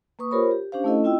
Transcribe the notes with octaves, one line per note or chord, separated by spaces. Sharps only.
A#3 B4 C#6 D#6
F4 G4 A#4 C5 C#5 B5
G4
C#4 D4 G4 C5 F5
A3 C#4 E4 A4 D#5
C4 E4 F4 D#5 G5 E6